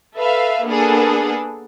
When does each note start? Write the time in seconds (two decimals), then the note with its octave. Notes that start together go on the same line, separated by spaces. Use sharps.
0.15 A4 B4 E5 F5
0.65 A#3 B3 D4 G#4 A4